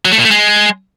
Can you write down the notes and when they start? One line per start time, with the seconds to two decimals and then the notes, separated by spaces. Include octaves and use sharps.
0.05 F#3
0.12 A3
0.18 A#2
0.25 A3
0.31 G#3